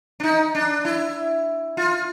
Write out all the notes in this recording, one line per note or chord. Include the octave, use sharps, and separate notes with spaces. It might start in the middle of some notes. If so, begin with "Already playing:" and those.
D4
D#4
D4
E4
F4